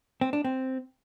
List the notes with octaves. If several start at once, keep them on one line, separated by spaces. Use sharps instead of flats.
C4
D4
C4